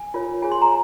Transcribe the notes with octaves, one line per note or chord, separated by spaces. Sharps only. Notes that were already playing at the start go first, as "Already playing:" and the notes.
Already playing: G#5
F4 A#4 C#5
F4 G#4 C#5 G#5
C6
A#5